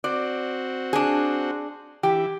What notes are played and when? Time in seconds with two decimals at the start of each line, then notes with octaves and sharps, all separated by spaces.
0.04 C4 F#4 D5
0.93 D4 G#4
2.03 E3 G4